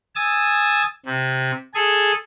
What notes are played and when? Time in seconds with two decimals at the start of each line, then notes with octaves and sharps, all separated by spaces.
0.16 G#5 D#6 E6 A6
1.05 C3
1.74 G#4 A4 G#5